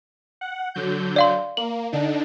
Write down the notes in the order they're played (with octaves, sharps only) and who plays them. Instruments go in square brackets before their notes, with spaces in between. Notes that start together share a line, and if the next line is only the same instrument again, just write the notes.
[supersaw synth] F#5
D3 F#3 G6
[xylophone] D5 F5 C6
[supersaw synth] A#3 [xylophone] F#7
[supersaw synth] D3 D4 D#4